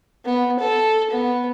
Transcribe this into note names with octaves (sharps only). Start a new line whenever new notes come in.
B3
A4
B3